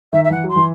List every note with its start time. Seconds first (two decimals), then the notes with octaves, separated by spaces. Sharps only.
0.12 D#3 E5
0.24 E5
0.30 E3 F#5
0.44 F#3 C6
0.56 E3